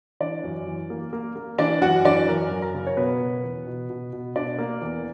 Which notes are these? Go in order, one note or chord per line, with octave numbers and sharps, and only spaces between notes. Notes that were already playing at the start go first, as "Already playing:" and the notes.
E3 D4 D5
F#2
E3
A#3
A#3
A#3
E3 D4 D5
F#2 F#4 F#5
E3 D4 D5
F#2 A#4
F#2
A#4
C#3
C#5
B2 B3 B4
B2
E2
B2
B2
B2
B2 D4 D5
A#3
E2